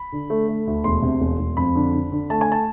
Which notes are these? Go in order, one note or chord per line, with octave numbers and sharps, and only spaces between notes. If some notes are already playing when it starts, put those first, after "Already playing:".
Already playing: B5
D3
A3
A3
D2
E1 C6
C3
E1
E1
F2 B5
D3
D3
D3
A3 A5
G#5
A5